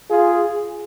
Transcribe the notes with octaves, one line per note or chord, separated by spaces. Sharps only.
F4 G#4